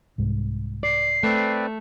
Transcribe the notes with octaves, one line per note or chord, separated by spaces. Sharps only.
C2 G#2
D5 C7
A3 C4 B4 D5